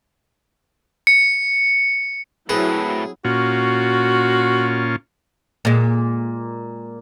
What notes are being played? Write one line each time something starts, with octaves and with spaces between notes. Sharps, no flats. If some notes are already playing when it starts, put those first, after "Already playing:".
C#7
A2 F#3 C4 E4 G#4 B4
A#2 C#4 F4 F#4
A#2 G#3